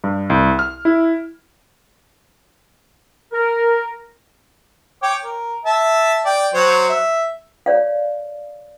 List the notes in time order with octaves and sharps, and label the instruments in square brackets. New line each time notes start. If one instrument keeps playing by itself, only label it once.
[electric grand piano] G2
C2
F6
E4
[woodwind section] A#4
[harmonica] C#5 G5 D6
A#4
E5 A5
D5 G5
F#3 C5 C#5
E5
[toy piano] C#5 D5 F5